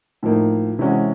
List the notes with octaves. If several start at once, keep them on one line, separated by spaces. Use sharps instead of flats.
A2 F3 A#3 D#4
C3 E3 G#3 C#4 F#4